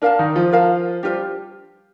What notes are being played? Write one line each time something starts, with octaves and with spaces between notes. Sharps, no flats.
D4 A#4 F5 A5
D#3 D#4
F3 F4
A#4 F5 A5
G3 D4 F4 G4 C5